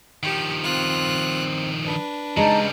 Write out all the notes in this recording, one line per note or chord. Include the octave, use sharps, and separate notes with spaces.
D#3 F3 G4
C4 F4 F#6
D4 B4
C#3 G3 G#3 D#4 A5 A#5